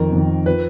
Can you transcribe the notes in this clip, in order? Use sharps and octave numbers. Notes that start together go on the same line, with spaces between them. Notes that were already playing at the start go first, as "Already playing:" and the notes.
Already playing: F2 D#3 A#4
F2 D#3
F3 B4